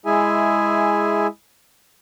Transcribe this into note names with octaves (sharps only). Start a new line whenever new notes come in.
G#3 E4 G#4 E5 G#5